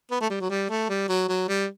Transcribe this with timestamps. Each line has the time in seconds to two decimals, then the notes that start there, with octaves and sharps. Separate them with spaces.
0.11 B3
0.21 A3
0.30 G3
0.41 F#3
0.50 G3
0.69 A3
0.89 G3
1.09 F#3
1.29 F#3
1.48 G3